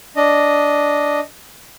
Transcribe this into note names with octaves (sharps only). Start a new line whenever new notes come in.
D4 D#5